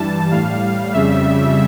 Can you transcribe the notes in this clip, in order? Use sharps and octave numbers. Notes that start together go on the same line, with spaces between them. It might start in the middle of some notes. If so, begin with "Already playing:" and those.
Already playing: G2 E3 G3 A5
A2 G3 F5
F2 C#3 G3 E5